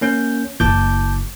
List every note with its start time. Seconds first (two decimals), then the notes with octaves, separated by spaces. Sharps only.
0.01 A#3 C#4 G6
0.60 F#1 A5 D6 G6